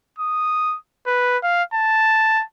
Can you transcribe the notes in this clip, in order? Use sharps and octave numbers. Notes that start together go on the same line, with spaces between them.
D#6
B4
F5
A5